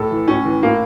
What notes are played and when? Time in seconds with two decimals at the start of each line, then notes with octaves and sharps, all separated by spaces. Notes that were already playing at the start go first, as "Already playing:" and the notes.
Already playing: A2 A4
0.11 E3
0.28 A2 C#4
0.45 E3
0.63 A2 A#3